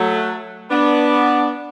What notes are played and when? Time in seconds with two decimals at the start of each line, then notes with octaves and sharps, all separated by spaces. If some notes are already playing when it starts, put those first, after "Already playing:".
Already playing: F#3 A3
0.70 B3 D4